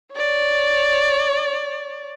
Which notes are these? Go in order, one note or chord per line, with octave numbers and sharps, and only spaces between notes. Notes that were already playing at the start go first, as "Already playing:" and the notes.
C#5 D5